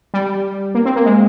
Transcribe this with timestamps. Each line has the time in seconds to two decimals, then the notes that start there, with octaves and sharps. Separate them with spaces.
0.14 G3
0.75 A#3
0.85 C4
0.96 A#3
1.05 G#3